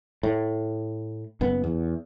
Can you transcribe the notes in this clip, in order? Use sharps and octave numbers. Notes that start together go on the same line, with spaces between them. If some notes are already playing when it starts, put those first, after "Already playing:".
A2
F#1 F#2 B3
E2